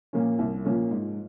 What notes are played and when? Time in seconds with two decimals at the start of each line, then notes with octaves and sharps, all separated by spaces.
0.13 A#2 F3 A#3 C#4
0.39 C2
0.65 A#2 F3 A#3 C#4
0.91 G#2